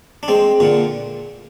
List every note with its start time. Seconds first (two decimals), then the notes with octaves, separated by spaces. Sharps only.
0.23 D4
0.28 G#3 C4
0.60 A#2 D3